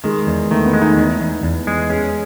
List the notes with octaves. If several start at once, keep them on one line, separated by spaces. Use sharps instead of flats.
D#3 G#3
E2
D#3 A3
B3
G#3
D#4
E2
E2
E2
G#3
C#4 G#4